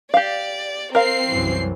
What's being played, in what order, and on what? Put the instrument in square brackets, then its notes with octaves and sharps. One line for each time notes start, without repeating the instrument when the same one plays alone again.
[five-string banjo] G4 F5 [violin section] D5
[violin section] C4 C7 [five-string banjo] A#4 F5
[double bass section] C2 F#2 E3